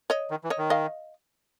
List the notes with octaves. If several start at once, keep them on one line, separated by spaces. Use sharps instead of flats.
C#5 D#5
D#3
E3
C#5 D#5
D#3
D#5 F5